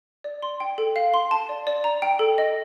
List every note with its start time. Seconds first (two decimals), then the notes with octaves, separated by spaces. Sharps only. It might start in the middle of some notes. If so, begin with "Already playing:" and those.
0.24 D5
0.42 C6
0.60 G5
0.78 A4
0.96 F5
1.14 C6
1.31 A5
1.49 D5
1.67 D5
1.84 A#5
2.02 G5
2.19 A4
2.38 D#5